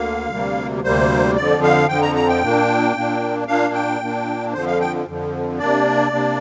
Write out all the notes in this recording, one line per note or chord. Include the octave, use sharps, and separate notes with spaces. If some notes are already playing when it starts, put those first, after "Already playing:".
Already playing: D2 D3 A#3 F5
D2 C3 G3 A#3
D2 C3 G3 A#3 C5
F2 D3 F3 D5
F5
F2 D3 F3 G5
A#5
A#5
G5
A#2 A#3 D4
A#2 A#3 D4
A#2 A#3 D4 F5
G5
A#2 A#3 D4
F2 D3 F3 C5
F5
G5
F2 D3 F3
C3 A#3 D4 D5
C3 A#3 D4